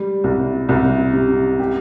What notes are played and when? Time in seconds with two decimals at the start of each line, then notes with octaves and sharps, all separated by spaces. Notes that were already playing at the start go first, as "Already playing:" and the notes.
Already playing: G3
0.24 C2
0.69 C2
1.13 C3
1.59 G4